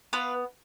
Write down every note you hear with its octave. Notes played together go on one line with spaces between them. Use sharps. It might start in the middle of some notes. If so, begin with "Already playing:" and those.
B3 F4 B4